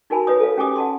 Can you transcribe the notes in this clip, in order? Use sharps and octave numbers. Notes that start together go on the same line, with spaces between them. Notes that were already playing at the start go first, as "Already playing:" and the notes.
D#4 F#4 A#4 G#5 A5 B5
F4 B4 C#5 D#6
A4 F5
C#4 G4 G#5 D6 D#6
F#5 A5 C6